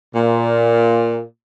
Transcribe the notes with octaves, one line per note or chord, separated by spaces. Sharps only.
A#2